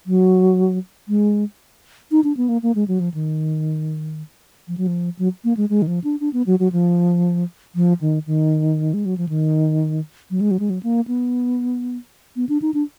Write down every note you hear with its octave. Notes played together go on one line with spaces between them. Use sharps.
F#3
G#3
D#4
D4
B3
A#3
A#3
G#3
F#3
F3
D#3
F3
F#3
F3
F#3
A#3
G#3
G#3
D#3
F3
D4
D4
B3
F#3
F#3
F3
F3
D#3
D#3
G#3
F#3
F3
D#3
F#3
G#3
F#3
G#3
F#3
A#3
B3
B3
D4
D#4
D4